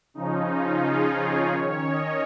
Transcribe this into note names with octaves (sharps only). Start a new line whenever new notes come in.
C#3 F3 C#4 D#4
F4
G#4
C#5
D#3 C#4 C#5
D#5